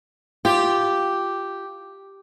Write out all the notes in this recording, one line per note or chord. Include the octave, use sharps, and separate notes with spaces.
F4 G4